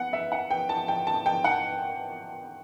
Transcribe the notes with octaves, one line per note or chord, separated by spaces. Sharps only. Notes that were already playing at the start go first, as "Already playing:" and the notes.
Already playing: B3 F#5
E5
F#5
G5
A5
G5
A5
G5
F#5